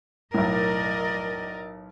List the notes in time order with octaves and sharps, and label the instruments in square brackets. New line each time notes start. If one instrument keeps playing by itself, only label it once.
[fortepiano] B1 A2 [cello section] A#4 D5 D#5